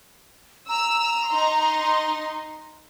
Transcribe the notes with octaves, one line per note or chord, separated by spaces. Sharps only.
A#5 E6
D#4 C6